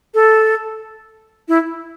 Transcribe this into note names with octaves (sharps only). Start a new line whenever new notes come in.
A4
E4